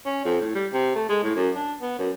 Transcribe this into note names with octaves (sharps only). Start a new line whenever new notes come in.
C#4
F2
A2
G3
C3
A3
G#3
A2
F#2
D4
B3
F#2